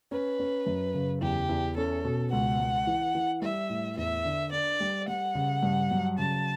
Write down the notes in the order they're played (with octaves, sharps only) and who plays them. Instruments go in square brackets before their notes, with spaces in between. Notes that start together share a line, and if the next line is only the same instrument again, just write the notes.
[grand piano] C#4 [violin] B4
[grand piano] C#4
F#2
C#3
[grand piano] E2 [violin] G4
[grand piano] E2
[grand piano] C#4 [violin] A4
[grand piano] B2
[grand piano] C#2 [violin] F#5
[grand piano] C#2
E3
E3
[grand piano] G3 [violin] E5
[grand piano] A2
[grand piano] E2 [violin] E5
[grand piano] D3
[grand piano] D4 [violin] D5
[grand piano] G3
[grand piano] G3 [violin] F#5
[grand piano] C#3
G2
F#3
[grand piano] C#3 [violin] A5